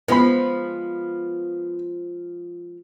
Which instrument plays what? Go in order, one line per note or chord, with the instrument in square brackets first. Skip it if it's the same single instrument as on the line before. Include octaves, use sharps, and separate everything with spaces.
[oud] F3 G#3 [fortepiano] B3 B5